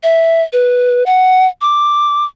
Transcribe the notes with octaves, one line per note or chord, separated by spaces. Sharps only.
E5
B4
F#5
D6